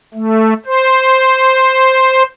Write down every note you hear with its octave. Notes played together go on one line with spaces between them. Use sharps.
A3
C5